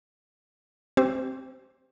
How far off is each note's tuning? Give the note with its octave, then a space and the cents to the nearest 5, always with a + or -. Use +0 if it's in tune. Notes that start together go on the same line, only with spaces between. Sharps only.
C4 +5 G4 -35 C5 -20